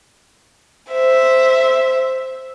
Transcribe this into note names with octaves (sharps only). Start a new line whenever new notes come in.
C5 E5